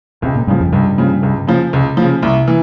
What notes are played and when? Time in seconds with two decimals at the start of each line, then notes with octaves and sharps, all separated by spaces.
0.22 C#2 C3
0.36 A#2
0.47 G2 C#3 F3
0.60 F2
0.72 C#2 G2
0.98 C#3 F3
1.23 C#2
1.47 C#3 F3
1.73 C#2
1.97 C#3 F3
2.22 C2
2.48 E3